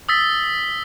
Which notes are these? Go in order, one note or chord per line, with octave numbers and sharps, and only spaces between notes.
D#6 E6 A6 B6